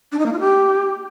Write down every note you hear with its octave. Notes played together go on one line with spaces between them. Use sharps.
D4
D#4
A#3
F4
G4